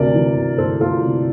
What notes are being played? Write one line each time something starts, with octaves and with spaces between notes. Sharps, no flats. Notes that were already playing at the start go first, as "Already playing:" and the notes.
Already playing: D2 C3 A#4 D5
E3
D2
D2 A4 C5
D2 F4 A4
C3